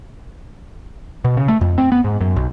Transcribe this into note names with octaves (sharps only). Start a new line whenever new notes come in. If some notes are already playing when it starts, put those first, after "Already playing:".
B2
C#3
A3
F2
C4
B3
G#2
F#2
B1